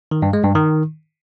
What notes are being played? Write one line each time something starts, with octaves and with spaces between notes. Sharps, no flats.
D#3
G2
G#3
G2
D#3